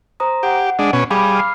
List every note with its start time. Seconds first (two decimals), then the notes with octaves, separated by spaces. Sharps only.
0.20 C5 A#5 D#6
0.43 G4 F#5
0.79 G#3 D4
0.93 B2 C#4
1.10 G3 G#4 F5 B5 D6
1.35 F6 C7